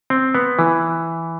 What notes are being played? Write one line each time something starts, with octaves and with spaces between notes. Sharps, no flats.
C4
B3
E3